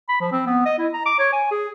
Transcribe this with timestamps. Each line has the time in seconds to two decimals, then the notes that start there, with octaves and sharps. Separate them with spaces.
0.09 B5
0.21 F3
0.32 C4
0.47 B3
0.66 D#5
0.78 E4
0.94 A#5
1.06 D6
1.19 C#5
1.33 G#5
1.51 G#4